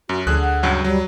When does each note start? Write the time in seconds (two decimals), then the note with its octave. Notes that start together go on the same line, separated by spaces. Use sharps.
0.09 F#2 F#4
0.27 D2 D3 F3 G#4 F#6
0.41 F#5
0.63 C#2 G2 F#3
0.84 F#3 G3